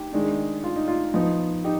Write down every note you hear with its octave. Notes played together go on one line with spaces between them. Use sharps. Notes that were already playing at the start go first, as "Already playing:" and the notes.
Already playing: D#4 G4
D#3 G#3 D4
F4
D#4
F4
F3 B3 D#4
D#4 G4